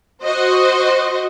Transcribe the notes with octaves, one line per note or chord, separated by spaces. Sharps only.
F#4 C5 D#5